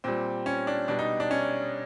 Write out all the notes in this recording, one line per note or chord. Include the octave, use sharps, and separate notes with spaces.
A#2 G3 C4
C#4
D4
B2 G3 D4
D#4
D4
C#4